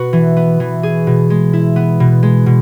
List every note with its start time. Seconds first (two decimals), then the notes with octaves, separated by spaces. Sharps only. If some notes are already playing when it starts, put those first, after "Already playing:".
Already playing: B2 B3 F#4 B4
0.13 E3
0.37 B3
0.60 E3
0.83 G#4
1.07 B2
1.30 G#3
1.53 E4
1.76 B3
2.00 B2
2.23 G#3
2.46 B2